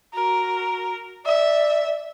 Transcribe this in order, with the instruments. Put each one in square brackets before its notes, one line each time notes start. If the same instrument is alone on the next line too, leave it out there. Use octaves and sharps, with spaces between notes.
[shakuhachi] F#4 [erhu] A#4
[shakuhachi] D5 [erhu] E5